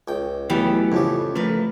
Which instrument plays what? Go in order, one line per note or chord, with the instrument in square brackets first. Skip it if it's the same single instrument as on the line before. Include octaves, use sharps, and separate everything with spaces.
[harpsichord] C#2 G5
[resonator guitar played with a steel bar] E3 B3 G4 [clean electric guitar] F#3 A3
[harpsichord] F2 A2 G3 [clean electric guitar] C#3
[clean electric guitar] F3 A3 [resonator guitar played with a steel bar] A#4 B4